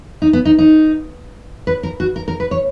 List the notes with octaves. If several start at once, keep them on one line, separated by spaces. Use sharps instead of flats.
D#4
B3
D#4
D#4
B4
A#4
F#4
A#4
A#4
B4
C#5